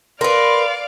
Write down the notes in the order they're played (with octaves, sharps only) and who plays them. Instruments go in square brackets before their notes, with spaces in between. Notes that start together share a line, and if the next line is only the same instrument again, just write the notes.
[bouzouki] A#4 B4 [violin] D5 F5 [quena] C6